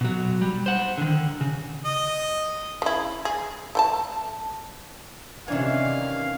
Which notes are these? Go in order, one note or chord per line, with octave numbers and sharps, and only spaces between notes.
B2 F#3
G3
C5 F#5
D3 D#3
C#3
D#5
C#3 E4
G#4
A3 G5 A5
C3 D#3 E3 C#4 D4 F5 G#5